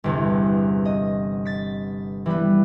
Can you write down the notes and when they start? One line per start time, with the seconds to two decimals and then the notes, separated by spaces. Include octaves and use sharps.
0.04 G1 E2 C3
0.85 D#5
1.45 A6 B6
2.26 E3 G3 B3 B4